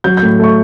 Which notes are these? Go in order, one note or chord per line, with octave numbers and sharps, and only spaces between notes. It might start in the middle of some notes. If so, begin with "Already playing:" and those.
F#3 G6
G6
A2
A3 C#6